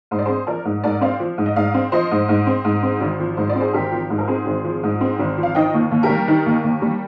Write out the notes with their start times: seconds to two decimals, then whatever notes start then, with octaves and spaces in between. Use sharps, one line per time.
0.11 G#2 C5
0.19 D5
0.26 C4 G#4 C5
0.47 F3 A#4 D5
0.65 G#2
0.84 G#2 A#4 D5
1.01 C4 D5 F5
1.20 F3
1.38 G#2
1.46 D#5
1.56 G#2 D5 F5
1.74 C4
1.92 F3 C5 D#5
2.11 G#2
2.29 G#2
2.47 C4
2.65 G#2
2.83 C4
3.01 G#1
3.20 F3
3.37 G#2 C5
3.49 D5
3.55 C4
3.61 G#4 C5
3.73 G#1 G4 A#4
3.92 F3
4.10 G#2 C5
4.18 A#4
4.27 C4 G#4 C5
4.46 G#1
4.64 F3
4.83 G#2
5.01 C4
5.19 G#1
5.38 F3
5.43 F5
5.55 D#3 D#5 G5
5.74 D#2
5.91 D#2
6.03 G4 A#4
6.09 G3
6.28 D#3
6.46 D#2
6.64 D#2
6.82 G3